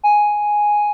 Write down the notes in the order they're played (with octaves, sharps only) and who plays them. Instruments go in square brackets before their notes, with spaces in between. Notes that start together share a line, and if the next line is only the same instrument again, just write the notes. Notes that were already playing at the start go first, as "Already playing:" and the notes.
[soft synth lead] G#5